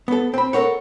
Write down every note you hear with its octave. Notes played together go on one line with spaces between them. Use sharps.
B3 A4
C4 B5
A4 A#4 C#5 F#5